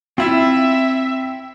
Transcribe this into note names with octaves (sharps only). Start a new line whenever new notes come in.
C4 E4 F4 E5 B5